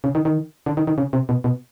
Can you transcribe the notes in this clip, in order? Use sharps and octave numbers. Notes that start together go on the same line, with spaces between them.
C#3
D#3
D#3
D3
D#3
D#3
C#3
C3
B2
B2